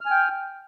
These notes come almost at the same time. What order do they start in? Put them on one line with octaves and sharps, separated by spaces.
F6 G#5 G5